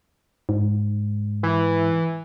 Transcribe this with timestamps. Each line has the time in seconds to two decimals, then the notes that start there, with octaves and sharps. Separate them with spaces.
0.49 G#2
1.43 E3